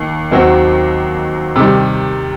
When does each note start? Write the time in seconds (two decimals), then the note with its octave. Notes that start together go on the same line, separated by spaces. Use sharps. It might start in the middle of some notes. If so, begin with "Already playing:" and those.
Already playing: D#2
0.31 D#2 D#3 F#3 C4 F#4
1.56 C3 D#3 G3